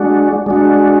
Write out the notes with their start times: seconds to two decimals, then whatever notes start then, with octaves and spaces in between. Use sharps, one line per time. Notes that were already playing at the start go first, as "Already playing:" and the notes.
Already playing: G#3 D4 F#4
0.46 G#3 D4 F#4